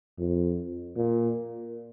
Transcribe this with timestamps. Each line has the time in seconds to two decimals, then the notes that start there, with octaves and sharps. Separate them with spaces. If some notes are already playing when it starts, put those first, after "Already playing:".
0.19 F2
0.96 A#2